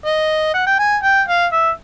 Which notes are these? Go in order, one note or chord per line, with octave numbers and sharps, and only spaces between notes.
D#5
F#5
G5
G#5
G5
F5
E5